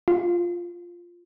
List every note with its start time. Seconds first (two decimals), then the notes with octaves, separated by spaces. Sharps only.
0.08 F4